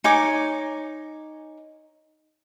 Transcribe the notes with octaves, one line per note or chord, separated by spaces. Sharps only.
D#4 C#5 G#5 D6